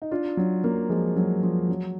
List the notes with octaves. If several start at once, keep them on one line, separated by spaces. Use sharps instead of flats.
D#4
D4 F4
F#3
F#3 A#3
F3 G#3
F#3
F3
F#3